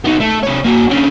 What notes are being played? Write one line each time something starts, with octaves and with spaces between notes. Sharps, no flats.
B3 D#4
A3
C3 C#5
A#3 F#4
D3 C#4